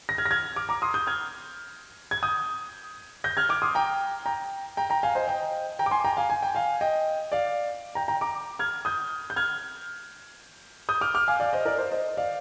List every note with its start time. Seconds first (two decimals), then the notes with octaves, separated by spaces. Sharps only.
0.09 A#6
0.18 F6 G#6
0.26 A#6
0.31 F6 G#6
0.56 D6 F6
0.69 A#5 D6
0.82 C6 D#6
0.94 D#6 G6
1.07 F6 G#6
2.11 G#6
2.23 D#6 G6
3.24 G6 A#6
3.37 F6 G#6
3.49 D6 F6
3.62 C6 D#6
3.75 G5 A#5
4.26 G5 A#5
4.77 G5 A#5
4.90 G5 A#5
5.03 F5 G#5
5.15 C5 D#5
5.28 D#5 G5
5.79 G5 A#5
5.86 D6
5.91 G#5 C6
6.04 G5 A#5
6.17 F5 G#5
6.30 G#5
6.43 G5
6.55 F5 G#5
6.81 D#5 G5
7.32 D5 F5
7.95 G5 A#5
8.08 G5 A#5
8.21 A#5 D6
8.59 F6 G#6
8.85 D#6 G6
9.30 G6
9.36 F6 G#6
10.89 D#6 G6
11.01 D6 F6
11.14 D6 F6
11.28 F5 G#5
11.40 D5 F5
11.53 C5 D#5
11.65 A#4 D5
11.78 C5
11.91 C5 D#5
12.17 D5 F5